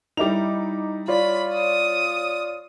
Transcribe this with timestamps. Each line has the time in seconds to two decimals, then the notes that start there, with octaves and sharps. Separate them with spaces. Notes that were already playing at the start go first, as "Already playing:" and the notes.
0.17 G3 D#4 E4 D6 F7
1.08 F4 C#5 D5 B5
1.54 D#6